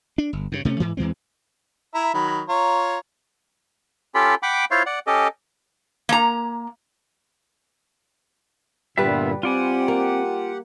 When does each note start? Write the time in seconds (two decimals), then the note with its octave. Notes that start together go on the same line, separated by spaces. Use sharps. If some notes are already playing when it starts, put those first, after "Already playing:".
0.18 D4
0.33 G1
0.52 G2 C#3
0.65 C3 A3 C4 C#4
0.80 G#2 E3
0.97 E2 E3 G#3 C4
1.94 E4 E5 A#5
2.14 D#3 F#3 B5
2.49 F4 C#5 A#5
4.15 C#4 F4 G4 A4 B5
4.43 F#5 G5 B5 D6
4.71 E4 F4 C5 C#5 F5
4.86 D5 F#5
5.07 C#4 G4 A4 D#5
6.09 A#3 A#5
8.98 G2 A#2 D3 G3 B3 F4 B4 E5
9.43 C4 F4 G4 D5 F#5 G#5
9.88 A#3